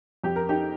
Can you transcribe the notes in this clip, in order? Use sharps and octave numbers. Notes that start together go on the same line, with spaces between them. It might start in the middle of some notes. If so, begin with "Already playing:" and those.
F2 G4
A#4
D#4 G4